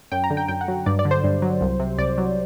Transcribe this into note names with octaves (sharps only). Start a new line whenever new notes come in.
F#2 G5
A#5
D3
G5
F#2 G5
F#5
F#3
G2 D5
D5
D3
C5
G2
F#3
C2
C3
C2 D5
F#3